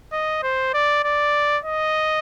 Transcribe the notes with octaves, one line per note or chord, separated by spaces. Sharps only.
D#5
C5
D5
D5
D#5